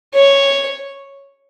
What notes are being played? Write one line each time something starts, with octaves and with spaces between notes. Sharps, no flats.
C#5